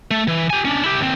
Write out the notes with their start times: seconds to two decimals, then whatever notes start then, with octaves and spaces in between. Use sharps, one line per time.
0.11 A3
0.28 E3
0.50 G4 G#5
0.65 C#4 D4
0.84 E4 G4
1.00 D#2 C4